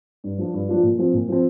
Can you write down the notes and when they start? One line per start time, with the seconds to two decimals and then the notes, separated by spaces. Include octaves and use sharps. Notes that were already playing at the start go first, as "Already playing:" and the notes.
0.24 G2
0.38 F3 D4 F4
0.54 G2
0.69 F3 D4 F4
0.83 A#2
0.98 F3 C4
1.14 A#2
1.28 F3 C4